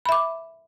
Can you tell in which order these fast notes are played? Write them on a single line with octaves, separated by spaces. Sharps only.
B5 E5 D6